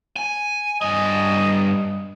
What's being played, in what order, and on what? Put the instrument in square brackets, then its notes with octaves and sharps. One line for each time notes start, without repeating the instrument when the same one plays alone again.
[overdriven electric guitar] G#5
[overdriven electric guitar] G2 G#5 [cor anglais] D#5